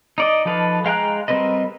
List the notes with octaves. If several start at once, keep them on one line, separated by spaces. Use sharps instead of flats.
D#4 D5 D#5
F3 D#4 A4 B4 F5
G#3 F5 G5 A#5 F#6
G3 C4 A#4 B4 D#5